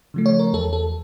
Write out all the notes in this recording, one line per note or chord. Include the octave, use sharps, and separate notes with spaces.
C#3 F3 A3
C#5
A#4
E2 A4
A4